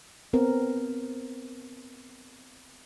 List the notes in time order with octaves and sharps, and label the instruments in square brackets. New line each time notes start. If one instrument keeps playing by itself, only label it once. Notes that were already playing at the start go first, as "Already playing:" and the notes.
[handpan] B3 C4 A#4